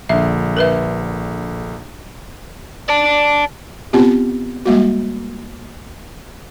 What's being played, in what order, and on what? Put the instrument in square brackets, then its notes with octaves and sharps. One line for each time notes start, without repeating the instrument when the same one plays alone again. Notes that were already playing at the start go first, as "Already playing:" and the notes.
[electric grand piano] A#1 D3 [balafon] E5
[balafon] A#4 B4 E5
[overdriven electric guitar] D5 A5
[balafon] B3 C4 F4 G4
G3 G#3 A#3 F#4